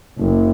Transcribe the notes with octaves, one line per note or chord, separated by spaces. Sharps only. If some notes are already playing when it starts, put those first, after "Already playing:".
F#1